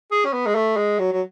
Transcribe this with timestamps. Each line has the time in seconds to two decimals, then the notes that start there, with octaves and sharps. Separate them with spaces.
0.11 G#4
0.25 C#4
0.33 B3
0.46 G#3
0.55 A3
0.77 G#3
0.99 F#3
1.12 F#3